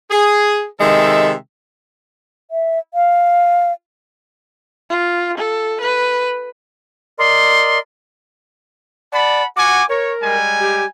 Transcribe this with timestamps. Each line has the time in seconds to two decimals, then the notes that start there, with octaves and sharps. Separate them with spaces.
0.11 G#4
0.80 C3 D#3 G#3 A4 E5
2.51 E5
2.94 F5
4.90 F4
5.38 A4
5.81 B4
7.19 A#4 D5 D#5 C6
9.12 D5 F#5 A5 B5
9.56 F#4 F#5 G#5 D6
9.89 A#4 C#5
10.21 G3 G#3 G#5
10.60 G4